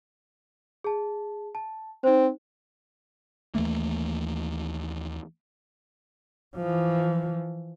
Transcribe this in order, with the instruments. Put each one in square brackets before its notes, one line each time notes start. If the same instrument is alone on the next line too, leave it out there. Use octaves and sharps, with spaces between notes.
[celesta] G#4 A5
A5
[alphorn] C4 [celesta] D#4 C5
[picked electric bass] D#2 E3 A3 A#3
[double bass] E3 F3